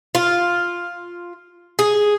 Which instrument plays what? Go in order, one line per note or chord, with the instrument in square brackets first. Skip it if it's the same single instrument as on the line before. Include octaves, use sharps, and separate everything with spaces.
[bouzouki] F4
G#4